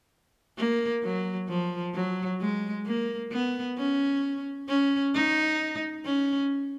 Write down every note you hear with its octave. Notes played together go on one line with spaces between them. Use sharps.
A#3
F#3
F3
F#3
G#3
A#3
B3
C#4
C#4
D#4
C#4